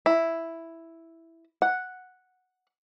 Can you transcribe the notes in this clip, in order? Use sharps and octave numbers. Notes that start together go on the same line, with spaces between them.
E4
F#5